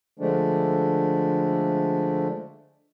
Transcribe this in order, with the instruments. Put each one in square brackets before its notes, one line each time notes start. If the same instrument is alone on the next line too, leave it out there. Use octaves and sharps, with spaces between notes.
[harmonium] D3 F3 G#3 A3 D4